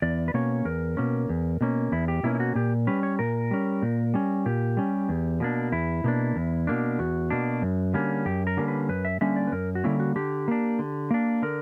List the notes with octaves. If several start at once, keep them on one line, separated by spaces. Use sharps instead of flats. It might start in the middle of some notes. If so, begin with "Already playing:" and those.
E2 D5
B4
B2 A#3 C#4 C#5
E2 A#4
B2 A#3 C#4
E2
B2 A#3 C#4
E2 E4
G4
B2 A#3 C#4 E4
E4
F#4
A#2 G4
G3 C#4 B4
C#5
A#2 A#4
G3 C#4
A#2
G3 C#4
A#2 G4
G3 C#4
E2
B2 A#3 D4
E2 E4
B2 A#3 D4
E2
B2 A#3 D4
E2 F#4
B2 A#3 D4
F#2
D3 G3 A#3 C#4
F#2 G4
A#4
D3 G3 A#3 C#4
B4
F#2 B4
E5
D3 G3 A#3 C#4 E5
D5
B4
F#2 A#4
F#4
D3 G3 A#3 C#4 E4
F#4
D3 G4
A#3 D4
D3
A#3 D4
D3 A#4